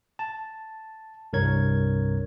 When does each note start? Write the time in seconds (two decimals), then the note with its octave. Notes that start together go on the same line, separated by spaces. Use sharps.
0.19 A5
1.33 C2 G2 A#4 C#5 G#6